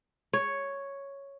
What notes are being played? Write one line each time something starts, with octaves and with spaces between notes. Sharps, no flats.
C#5